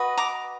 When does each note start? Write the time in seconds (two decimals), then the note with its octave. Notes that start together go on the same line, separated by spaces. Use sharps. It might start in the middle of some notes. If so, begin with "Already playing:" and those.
Already playing: F#4 B4 D#5
0.18 A#5 D6